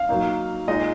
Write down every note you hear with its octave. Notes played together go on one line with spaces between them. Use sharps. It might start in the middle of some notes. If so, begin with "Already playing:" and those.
Already playing: F5
F#3 A#3 D#4
A#2 G#3 D#4 D#5